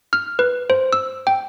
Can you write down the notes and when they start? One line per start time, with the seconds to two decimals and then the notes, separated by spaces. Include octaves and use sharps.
0.13 F6
0.39 B4
0.70 C5
0.93 E6
1.27 G5